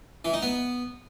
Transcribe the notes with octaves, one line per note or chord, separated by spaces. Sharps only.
E3
D#4
B3